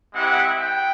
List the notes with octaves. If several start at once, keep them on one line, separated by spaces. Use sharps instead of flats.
G#3 C4 E4 G4 F#5
G5